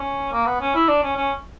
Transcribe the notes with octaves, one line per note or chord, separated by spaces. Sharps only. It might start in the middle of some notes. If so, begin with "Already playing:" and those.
Already playing: C#4
A#3
B3
C#4
E4
D4
C#4
C#4